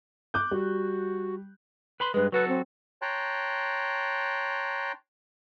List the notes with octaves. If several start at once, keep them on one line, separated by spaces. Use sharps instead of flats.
D6 F#6 G6
G3 F#4
B4 B5 C6
G2 G#3 B4
F#3 F#4 A4 B4
C4
C#5 G5 A5 A#5 C6 F#6